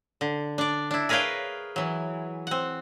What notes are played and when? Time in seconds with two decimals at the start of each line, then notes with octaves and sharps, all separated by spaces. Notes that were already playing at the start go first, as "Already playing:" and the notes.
0.21 D3
0.58 D4 D5
0.91 D4 E4
1.09 G#4 A#4 B4 C#5 F5 G5
1.76 E3 F#3
2.47 C4 F#5